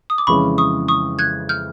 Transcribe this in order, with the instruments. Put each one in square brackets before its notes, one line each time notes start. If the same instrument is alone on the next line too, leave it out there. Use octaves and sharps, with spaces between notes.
[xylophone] D#6
D6
[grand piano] F2 C#3 E3 G#3 C#4 [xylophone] B5 C#6
[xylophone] C#6 D#6
C#6 D#6
F#6 G#6
F6 G6